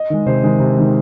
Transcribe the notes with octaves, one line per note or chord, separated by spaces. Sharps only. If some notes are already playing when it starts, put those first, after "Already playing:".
Already playing: D#5
D#3 G#3
C3 C5
D#3 G#3
C3
D#3 G#3